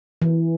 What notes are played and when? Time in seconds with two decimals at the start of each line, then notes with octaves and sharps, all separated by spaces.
0.22 E3